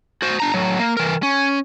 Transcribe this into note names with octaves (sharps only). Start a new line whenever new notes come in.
F#4 C5
D4 A#5
A2 F#3
A#3
E3 A#4
C#4